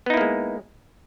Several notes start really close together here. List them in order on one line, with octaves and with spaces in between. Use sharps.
B3 D#4 E4 A#3 G#3